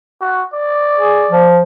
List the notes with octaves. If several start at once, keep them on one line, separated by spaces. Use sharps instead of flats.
F#4
D5
G#4
F3